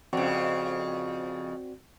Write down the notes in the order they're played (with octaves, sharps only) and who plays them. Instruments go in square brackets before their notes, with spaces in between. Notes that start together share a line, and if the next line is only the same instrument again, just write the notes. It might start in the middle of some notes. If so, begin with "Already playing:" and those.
[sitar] F2 C#3 [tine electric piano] C4 F#4 D5